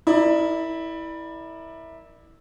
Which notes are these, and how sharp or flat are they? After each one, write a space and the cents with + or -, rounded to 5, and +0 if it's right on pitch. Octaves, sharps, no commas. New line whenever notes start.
E4 -15 A#4 +0 D5 +20